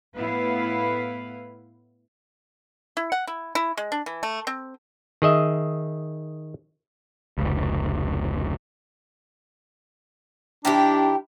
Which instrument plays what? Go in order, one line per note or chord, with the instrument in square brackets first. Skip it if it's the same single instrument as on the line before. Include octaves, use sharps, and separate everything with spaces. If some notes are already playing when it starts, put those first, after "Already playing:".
[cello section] A2 B3 E4 B4 F5
[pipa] E4
F#5
E4
E4
G#3
D4
E3
A3
C4
[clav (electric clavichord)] D#3 G#4 D#5 E5
[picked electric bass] F1 C#2
[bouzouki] D#3 E4 G4 [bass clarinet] D4